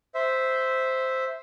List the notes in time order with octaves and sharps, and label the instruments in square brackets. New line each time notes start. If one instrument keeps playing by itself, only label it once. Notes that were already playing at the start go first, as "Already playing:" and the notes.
[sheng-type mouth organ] C5 E5